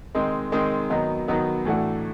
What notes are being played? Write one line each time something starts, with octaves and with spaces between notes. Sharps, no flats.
D#3 G#3 C4 D#4
D#3 G#3 C4 D#4
D#3 F#3 B3 D#4
D#3 F#3 B3 D#4
A2 E3 A3 D4 F#4